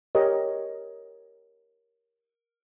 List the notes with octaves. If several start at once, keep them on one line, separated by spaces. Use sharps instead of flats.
G4 A#4 C#5 D#5